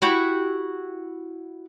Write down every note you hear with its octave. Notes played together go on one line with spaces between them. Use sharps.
E4 F#4 G4